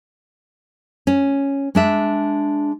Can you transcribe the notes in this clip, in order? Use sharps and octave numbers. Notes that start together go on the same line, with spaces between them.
C#4
G#3 D4 E5